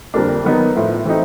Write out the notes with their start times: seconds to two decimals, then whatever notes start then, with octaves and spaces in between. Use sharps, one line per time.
0.14 F2 D3 G3 A#3 D4
0.44 D#3 F#3 B3 D#4
0.75 A2 F3 A3
1.05 E3 A3 C4 D#4